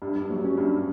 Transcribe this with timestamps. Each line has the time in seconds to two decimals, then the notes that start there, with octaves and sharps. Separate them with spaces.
0.02 G2
0.16 G2
0.30 F#3
0.44 C#4
0.57 G2